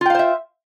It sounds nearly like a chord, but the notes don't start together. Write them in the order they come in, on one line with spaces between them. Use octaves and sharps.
F4 G5 F5 C5 E5